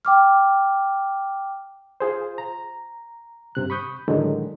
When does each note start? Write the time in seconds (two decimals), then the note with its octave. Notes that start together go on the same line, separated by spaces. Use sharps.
0.05 G5 D6 F6
2.00 F4 G#4 C5
2.38 A#5
3.55 G2 C3 F#6
3.70 B5 C#6 D#6 G6
4.08 A2 D3 D#3 F#3 G#3